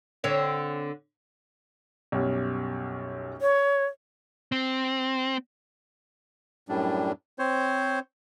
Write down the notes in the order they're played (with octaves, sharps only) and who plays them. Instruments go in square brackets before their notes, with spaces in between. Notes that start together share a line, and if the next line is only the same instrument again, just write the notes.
[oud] D3 C4 C#5
[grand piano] B1 F#2 G3
[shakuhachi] C#5
[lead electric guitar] C4
[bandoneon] F#2 A2 G3 D4
C4 C5 C#5